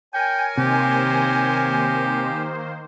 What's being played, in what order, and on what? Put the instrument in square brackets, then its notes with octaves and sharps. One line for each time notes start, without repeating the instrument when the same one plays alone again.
[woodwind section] A#4 C#5 G#5 [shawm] G5
[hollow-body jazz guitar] C3 [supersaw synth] D#3 A#3 C5 [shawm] G4